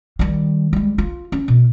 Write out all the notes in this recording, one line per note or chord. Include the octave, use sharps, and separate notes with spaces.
D#3 G3
G3 G#3
F4
C#4
B2